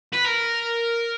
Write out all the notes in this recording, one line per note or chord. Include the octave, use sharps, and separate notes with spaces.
B4
A#4